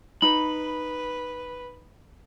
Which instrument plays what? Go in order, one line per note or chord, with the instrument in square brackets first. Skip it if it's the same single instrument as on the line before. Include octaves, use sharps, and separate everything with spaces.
[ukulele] D#4 [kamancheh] B4 [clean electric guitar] B5